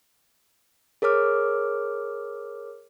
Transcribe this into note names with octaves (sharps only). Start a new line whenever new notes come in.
G#4 A#4 C#5 D6 F6